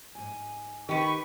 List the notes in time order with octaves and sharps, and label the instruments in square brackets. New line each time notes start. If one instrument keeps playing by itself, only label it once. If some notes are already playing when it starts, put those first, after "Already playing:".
[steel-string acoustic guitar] G#2 G#5
[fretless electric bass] D#3 [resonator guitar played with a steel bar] G4 B4 [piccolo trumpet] C#6